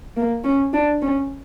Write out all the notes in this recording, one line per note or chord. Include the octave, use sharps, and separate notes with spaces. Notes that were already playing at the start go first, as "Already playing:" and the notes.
A#3
C#4
D4
C#4